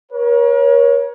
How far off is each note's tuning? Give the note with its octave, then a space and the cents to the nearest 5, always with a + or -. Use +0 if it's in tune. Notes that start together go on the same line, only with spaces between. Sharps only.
A#4 +40 C#5 +0